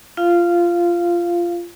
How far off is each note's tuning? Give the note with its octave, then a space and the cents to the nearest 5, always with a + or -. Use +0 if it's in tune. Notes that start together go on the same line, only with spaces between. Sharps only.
F4 -15 F5 -10